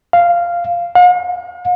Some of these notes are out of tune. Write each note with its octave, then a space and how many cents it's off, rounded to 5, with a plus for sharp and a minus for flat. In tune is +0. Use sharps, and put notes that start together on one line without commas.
F5 -10
F5 +45